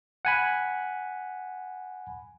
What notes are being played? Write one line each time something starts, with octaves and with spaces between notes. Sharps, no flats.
F#5 G#5 B5